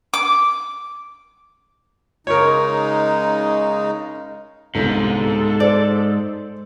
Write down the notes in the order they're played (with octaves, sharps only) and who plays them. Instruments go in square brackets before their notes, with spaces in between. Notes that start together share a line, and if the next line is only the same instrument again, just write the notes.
[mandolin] D6
[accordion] C#3 G#3 D#4 [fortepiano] A#4 C#5
[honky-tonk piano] G1 C2 [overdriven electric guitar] G#2 [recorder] A4
[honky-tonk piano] C5 [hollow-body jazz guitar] D5